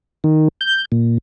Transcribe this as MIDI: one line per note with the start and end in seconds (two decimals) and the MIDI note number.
0.24 0.48 51
0.61 0.85 91
0.92 1.18 46